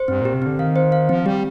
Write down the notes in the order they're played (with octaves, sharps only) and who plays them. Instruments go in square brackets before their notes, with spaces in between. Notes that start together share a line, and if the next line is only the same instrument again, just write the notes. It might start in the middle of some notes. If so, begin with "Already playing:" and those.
Already playing: [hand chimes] C5
[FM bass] G2 [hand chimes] C4
[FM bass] A#2 [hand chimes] G4
[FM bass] C3
[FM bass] D3 [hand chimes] C4
[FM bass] D#3 [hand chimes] F5
[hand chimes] C5
F5
[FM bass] F3 [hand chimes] C4
[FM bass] G3 [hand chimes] G4